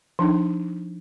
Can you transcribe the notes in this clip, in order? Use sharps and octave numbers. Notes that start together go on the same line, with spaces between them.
F3 D4 D#4